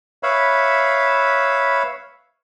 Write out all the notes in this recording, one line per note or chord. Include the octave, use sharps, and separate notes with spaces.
B4 C#5 E5 F5 B5